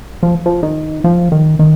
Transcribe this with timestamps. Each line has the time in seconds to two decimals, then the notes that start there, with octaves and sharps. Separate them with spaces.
0.23 F3
0.46 F3
0.63 D#3
1.04 F3
1.32 D#3
1.59 D#3